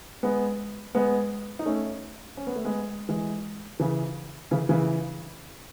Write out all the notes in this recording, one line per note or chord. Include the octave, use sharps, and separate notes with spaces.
G#3 B3
G#3 B3
D#4
A3 C#4
C#4
B3
A3
G#3 B3
E3 G#3
C#3 E3
C#3 E3
C#3 E3